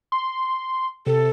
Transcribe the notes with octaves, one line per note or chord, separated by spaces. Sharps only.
C6
C3 A4